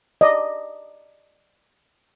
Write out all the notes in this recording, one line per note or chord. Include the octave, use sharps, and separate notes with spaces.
D5 D#5